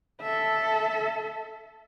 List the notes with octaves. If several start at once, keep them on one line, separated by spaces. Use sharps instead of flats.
A4 E5